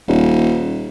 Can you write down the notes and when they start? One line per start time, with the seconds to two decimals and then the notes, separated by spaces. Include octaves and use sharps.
0.08 D#1